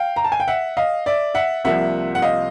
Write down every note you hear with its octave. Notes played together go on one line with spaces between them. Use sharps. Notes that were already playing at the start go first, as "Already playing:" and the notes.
Already playing: F5 G5
A#5
A5
G#5
G5
E5 F#5
D#5 F5
D5 E5
E5 F#5
C2 C3 F3 A#3 E5 F#5
F#5
D#5 F5